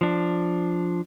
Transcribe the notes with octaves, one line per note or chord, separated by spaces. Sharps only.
F3 D4